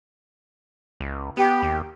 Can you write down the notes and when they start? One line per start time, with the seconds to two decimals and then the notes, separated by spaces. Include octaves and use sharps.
1.00 C#2
1.37 B3 G4
1.62 D#2